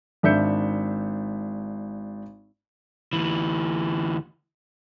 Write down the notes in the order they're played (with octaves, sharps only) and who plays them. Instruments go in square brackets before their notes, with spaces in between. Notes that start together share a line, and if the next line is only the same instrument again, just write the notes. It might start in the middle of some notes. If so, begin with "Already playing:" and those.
[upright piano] G#1 D4 E5 G6 C#7
[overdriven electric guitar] D2 E3